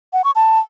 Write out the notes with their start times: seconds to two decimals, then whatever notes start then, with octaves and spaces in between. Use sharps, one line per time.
0.13 F#5
0.24 C#6
0.36 A5